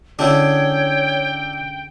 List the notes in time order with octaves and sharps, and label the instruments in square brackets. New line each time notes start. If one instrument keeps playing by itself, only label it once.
[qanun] D3 G#3 C#4 [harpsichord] D4 E4 [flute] C#5 [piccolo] G5